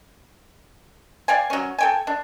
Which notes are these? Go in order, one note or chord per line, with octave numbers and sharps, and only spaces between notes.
D5 F5 G5 G#5
F#3 C#4
A4 G5 G#5
D4